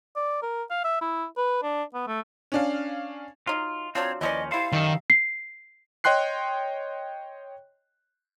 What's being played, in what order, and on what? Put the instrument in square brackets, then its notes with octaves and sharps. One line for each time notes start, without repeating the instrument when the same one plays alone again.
[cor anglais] D5
A#4
F5
E5
E4
B4
D4
B3
A3
[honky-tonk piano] C#4 D4 F5
[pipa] F#3 D#4 [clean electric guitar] F4
[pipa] F#3 D4 F4 [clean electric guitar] C4 [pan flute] C#5
[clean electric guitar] D#2 F3 C#4 [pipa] E3 G#4 D5 [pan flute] D#5
[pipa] G3 E4 [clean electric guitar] A4 C5 [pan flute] F5
[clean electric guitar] F#2 A4 [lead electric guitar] D#3 [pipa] G3
[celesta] C7
[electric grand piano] C#5 D#5 G5 C6 F#6 C7